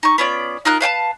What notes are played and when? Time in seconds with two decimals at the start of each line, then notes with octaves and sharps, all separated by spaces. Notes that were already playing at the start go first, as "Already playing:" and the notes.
0.03 D#4 C#6
0.18 B3 C#4 F4 D5
0.65 D#4 F4 A#4 F#6
0.80 B4 F5 G5 A5